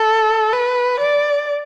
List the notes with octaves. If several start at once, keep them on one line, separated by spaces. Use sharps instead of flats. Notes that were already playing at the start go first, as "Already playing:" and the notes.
Already playing: A4
B4
D5